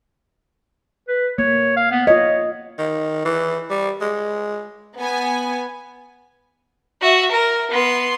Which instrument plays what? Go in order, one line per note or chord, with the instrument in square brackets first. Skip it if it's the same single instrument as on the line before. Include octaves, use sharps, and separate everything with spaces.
[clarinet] B4
[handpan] A#3 [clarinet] C#5
[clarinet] F5
B3
[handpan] F4 D#5 [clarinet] C#5
[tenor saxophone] D#3
E3
G3
G#3
[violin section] B3 G#5
[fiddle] F#4 E5
A#4
B3 C6